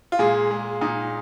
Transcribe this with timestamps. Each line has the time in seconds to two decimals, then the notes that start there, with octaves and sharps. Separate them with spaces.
0.12 F4
0.19 A#2 G#3 G#4
0.51 G#3
0.81 A#2 D#4